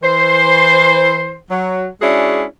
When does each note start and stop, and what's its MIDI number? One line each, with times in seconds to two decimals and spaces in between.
0.03 1.36 52
0.03 1.36 72
1.50 1.87 54
2.02 2.44 56
2.02 2.44 61
2.02 2.44 62
2.02 2.44 64
2.02 2.44 66
2.02 2.44 68